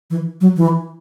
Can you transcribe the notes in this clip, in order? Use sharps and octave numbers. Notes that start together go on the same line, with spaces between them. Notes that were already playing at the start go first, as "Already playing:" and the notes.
E3
F#3
E3